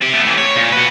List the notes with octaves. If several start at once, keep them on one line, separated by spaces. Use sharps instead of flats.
C4 G4
A3 B3
A2 E3
C#5
A#2
F#4 B4